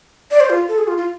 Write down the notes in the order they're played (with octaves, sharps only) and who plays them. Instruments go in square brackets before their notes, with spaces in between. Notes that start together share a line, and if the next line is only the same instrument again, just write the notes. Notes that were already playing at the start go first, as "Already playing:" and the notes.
[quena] D5
C5
F4
A4
G#4
F4
F4